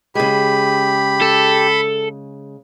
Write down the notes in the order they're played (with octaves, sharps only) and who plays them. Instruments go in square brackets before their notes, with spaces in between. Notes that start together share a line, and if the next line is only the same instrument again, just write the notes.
[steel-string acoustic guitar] C#3 G#3 [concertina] G4 [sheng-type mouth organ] B5
[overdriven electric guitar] A4